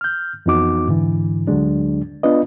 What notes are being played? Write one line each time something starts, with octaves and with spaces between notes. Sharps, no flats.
F6 G6
F2 E3 B3 D#4 F#4 D6
G#2 D3 E3
D2 D3 F#3 G#3 D4
B3 D4 F4 B4 D#5